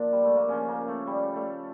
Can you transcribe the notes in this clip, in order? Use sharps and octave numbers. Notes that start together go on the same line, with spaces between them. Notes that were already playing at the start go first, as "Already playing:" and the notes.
Already playing: A#2 F3 D4
G3
A3
A#3
C#3 F3 C#4
A#3
A3
G3
A3